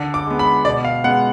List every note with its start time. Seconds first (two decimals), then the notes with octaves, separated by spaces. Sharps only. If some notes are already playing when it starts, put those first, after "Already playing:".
Already playing: D3
0.14 D6
0.26 G#3 B3
0.39 B5
0.65 B2 D5
0.84 F5
1.04 G#3 B3 F#5